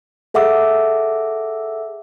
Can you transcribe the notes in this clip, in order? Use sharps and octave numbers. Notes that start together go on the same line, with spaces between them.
G#4 A4 E5 F#5 D6 E6